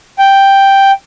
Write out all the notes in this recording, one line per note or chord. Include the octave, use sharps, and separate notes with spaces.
G5